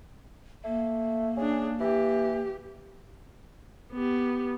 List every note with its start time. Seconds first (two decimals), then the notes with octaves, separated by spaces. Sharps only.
0.64 A3 A#3
1.37 C#4 D4 G#4
1.81 E3 G4
3.93 B3 G4